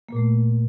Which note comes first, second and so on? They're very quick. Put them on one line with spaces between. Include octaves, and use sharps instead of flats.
A#3 A#2 A3